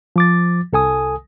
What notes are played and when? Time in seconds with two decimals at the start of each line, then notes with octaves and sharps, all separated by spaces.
0.16 F3 D6 A6
0.73 C2 A4 G#5 D#6